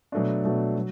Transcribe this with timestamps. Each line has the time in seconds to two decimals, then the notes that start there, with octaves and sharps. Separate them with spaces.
0.12 B2 F#3 A3 D4
0.44 B2 F#3 A3 D4
0.76 F#3